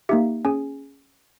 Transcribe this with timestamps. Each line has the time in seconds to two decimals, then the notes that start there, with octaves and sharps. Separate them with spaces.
0.09 A#3 D#4 G4 E5
0.45 C#4 G#4 G#5